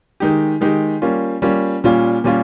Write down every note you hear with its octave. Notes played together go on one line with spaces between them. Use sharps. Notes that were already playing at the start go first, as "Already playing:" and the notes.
D#3 G#3 D#4 G4
D#3 G#3 D#4 G4
G3 A#3 C#4 F4
G3 A#3 C#4 F4
A#2 G3 C#4 F4
A#2 G3 C#4 F4